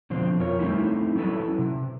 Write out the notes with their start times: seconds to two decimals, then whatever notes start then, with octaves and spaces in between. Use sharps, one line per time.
0.10 B2 D3 F3 C4
0.40 F2 F4 A#4 C#5
0.59 G3 A3 C4 C#4 D#4 E4
1.16 F#3 C#4 E4 A4 B4
1.59 C3